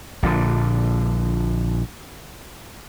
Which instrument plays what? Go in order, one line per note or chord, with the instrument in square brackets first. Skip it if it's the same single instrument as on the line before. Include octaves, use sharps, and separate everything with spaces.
[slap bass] A#1 A#2 D3